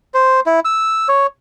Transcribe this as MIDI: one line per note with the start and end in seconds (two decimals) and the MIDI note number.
0.14 0.40 72
0.46 0.60 64
0.65 1.08 88
1.08 1.27 73